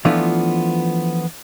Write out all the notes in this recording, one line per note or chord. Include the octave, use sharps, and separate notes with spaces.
E3 F3 A3 B3 D4 F4